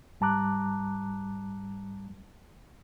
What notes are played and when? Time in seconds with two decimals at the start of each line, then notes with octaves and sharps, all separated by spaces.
0.20 G#2 G3 A5 A#5 D6 F#6